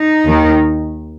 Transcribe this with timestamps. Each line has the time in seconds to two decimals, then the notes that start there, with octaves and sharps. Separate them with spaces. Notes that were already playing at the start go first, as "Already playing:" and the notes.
Already playing: D#4
0.25 D#2 D#3